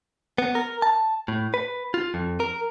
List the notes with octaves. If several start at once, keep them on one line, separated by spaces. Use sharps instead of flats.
B3
A#4
A5
A2
B4
F4
F2
A#4